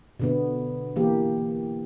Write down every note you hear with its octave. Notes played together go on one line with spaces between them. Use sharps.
B2 D3 B3
E3 A#3 G4